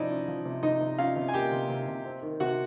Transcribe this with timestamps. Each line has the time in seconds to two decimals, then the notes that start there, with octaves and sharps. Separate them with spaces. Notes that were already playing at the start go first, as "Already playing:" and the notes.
Already playing: C3 F3 C#4 D#4 E4 D5 D#5
0.10 C#4
0.28 F3
0.46 C3
0.63 C3 D#4 D#5
0.81 C3
0.99 C#4 F4 F5
1.16 C3
1.28 G#5
1.34 A#3 G4 G5
1.52 C3
1.69 C3
1.88 C3
2.05 C4
2.22 D#3
2.40 C3 F#4 F#5